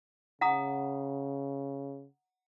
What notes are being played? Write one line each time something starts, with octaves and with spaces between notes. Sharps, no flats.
C#3 F#5 A#5 D#6